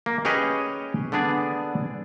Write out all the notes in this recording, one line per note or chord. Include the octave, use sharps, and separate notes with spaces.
A#3
C#4 G4 G#4 B4 C#5 D#5
D3 B3 D4 G#4 D5